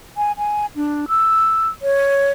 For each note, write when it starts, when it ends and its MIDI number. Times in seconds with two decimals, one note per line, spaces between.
0.17 0.32 80
0.38 0.66 80
0.76 1.06 62
1.09 1.69 88
1.82 2.32 73